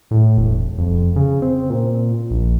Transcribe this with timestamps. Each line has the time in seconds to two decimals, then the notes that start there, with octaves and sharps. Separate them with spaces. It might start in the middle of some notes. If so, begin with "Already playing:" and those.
0.11 A2
0.38 E1
0.78 F2
1.16 C#3
1.42 C4
1.70 A#2
2.31 A#1